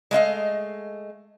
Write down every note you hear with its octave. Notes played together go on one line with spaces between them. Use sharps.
G#3 A3 D#5 F5